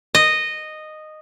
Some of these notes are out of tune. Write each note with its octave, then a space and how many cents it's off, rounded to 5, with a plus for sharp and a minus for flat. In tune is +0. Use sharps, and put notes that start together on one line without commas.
D#5 -10